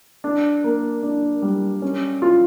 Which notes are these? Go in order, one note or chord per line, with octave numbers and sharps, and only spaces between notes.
D4
A#3
D4
G3
C#4
F4